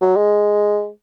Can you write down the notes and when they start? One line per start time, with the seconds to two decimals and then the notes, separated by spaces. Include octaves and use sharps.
0.01 F#3
0.17 G#3